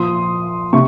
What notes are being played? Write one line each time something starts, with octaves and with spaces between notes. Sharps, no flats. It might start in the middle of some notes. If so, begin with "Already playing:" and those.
Already playing: A#2 F3 C6 D#6
C3 C#6